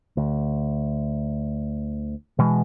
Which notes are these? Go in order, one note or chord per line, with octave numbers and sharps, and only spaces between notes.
D2
B2 E3 G#3